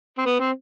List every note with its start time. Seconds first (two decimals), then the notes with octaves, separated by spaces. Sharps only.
0.18 C4
0.25 B3
0.40 C4